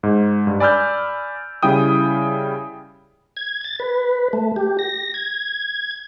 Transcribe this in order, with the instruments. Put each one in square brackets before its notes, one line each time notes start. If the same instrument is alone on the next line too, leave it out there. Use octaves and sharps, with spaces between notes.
[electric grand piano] G#2
G2
D5 G#5 B5 E6 F6 G6
C#3 G3 E4 G5 D#6
[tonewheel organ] G#6
A6
B4
A3
G4
A#6
G#6